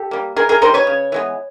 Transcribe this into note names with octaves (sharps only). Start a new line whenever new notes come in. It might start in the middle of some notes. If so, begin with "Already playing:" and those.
Already playing: G4 A4
G3 A#3
E3 G#4 A#4
G#4 A#4
G3 C4 D#4 A#4 C5
B4 C#5
C#3
E3 G#3 B3